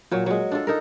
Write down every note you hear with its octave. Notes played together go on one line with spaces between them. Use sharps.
A#2 F#3
F#3 G#3
D4 F4 A4
D#4 A4 A#4